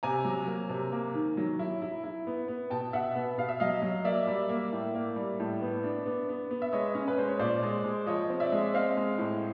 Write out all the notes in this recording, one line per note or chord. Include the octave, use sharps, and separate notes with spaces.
C3 G#5 A#5
F#3
A#3
C3
A#3
D#3
F#3
E4
E4
E4
B3
B3
B2 G5 A5
B2 E5 F#5
B3
B2 F5
E5
F#3 D#5 F5
F#3
A#3 D5 E5
G3
A#3
A2
A#3
G3
A2
B3
D4
B3
B3
B3
E5
G#3 C#5 D#5
C#4
B4
G#3 C5
C#5
A#2 C5 D5
G#3
G#3
F3 C#5 D#5
C4
D5 E5
G#3
C4 D#5 F5
G#3
A2